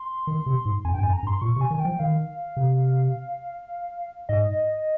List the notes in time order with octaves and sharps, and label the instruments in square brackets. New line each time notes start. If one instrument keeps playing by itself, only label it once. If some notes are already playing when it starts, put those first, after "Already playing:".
Already playing: [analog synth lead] C6
[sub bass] D#3
C3
G#2
[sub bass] F2 [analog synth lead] G#5
[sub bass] G2 [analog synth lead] G5
[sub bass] F2 [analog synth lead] G#5
[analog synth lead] A#5
[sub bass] G2
[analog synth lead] C6
[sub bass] A#2 [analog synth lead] C#6
[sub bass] C3
[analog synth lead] G#5
[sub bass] D#3
[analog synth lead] G#5
G5
[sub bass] F3
[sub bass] D#3 [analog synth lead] F5
[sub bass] C3
[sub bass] G#2 [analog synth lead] D#5